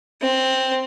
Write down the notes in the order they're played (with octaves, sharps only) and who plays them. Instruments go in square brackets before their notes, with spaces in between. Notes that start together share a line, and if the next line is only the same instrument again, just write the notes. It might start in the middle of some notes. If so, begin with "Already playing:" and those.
[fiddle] C4